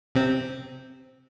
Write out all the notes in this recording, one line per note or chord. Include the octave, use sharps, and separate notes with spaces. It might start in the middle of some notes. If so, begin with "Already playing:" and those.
C3 C4